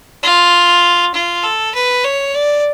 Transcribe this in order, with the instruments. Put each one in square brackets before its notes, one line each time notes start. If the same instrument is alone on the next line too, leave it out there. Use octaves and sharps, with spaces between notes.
[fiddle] F4
F4
A4
B4
C#5
D5